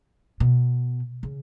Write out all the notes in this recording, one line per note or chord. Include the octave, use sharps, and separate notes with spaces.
B2
C#3